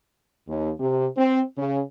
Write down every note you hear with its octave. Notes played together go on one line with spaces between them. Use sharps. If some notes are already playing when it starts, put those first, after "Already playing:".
D#2
C3
C4
C#3